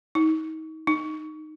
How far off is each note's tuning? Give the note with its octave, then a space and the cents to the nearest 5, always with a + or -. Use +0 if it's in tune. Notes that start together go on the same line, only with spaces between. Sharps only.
D#4 +30
D#4 -10